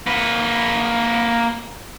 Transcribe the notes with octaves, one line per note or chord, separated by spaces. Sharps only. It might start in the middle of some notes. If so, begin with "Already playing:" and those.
A#3 B4